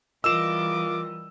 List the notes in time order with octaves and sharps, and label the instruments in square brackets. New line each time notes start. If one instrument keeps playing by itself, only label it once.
[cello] E3 G3 [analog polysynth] F4 A#4 D#5 [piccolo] D6 [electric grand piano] E6 E7